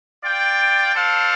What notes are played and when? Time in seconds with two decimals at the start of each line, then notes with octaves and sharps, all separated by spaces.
0.22 F4 D5 G5
0.94 D4 A4 C5 F5